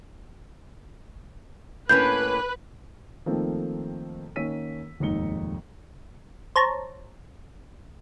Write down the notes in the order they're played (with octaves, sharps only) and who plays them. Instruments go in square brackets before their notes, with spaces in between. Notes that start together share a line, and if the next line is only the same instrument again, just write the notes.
[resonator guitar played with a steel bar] A2 A#3 C#4 [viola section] B4 [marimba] G6
[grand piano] D#3 F3 A3 A#3 C4 A4
D#3 A#3 C#4 E6 B6 D#7
F1 D#2 G#2 D#4 C#7 G7
[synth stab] C5 C#5 A5 A#5